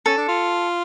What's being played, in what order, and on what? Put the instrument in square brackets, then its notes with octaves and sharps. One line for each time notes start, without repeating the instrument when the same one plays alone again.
[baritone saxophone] C#4 [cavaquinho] A4
[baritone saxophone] D4
F4